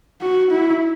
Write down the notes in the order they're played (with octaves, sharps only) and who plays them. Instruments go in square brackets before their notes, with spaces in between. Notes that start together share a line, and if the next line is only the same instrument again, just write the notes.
[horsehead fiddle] F#4
E4